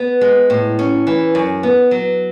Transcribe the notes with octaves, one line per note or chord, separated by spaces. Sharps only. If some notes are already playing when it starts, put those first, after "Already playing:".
Already playing: B3
G#3
A2
C#4
E3
F#2
B3
F#3